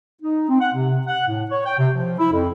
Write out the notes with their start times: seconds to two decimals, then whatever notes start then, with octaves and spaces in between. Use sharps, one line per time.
0.22 D#4
0.49 C4
0.60 F#5
0.74 C3
1.07 F#5
1.28 A2
1.51 C#5
1.66 G5
1.78 C3
1.94 F3
2.18 E4
2.32 F2